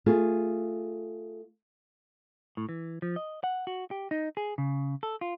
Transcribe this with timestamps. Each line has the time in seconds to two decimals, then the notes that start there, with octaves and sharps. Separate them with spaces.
0.06 A3 F4 G#4
2.57 A2
2.69 E3
3.02 F3
3.16 D#5
3.44 F#5
3.67 F#4
3.91 G4
4.11 D#4
4.37 G#4
4.58 C#3
5.03 A4
5.21 F4